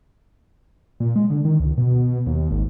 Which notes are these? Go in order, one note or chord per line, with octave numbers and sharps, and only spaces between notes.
A#2
G#3
D3
D#3
C#2
B2
D#2
G#1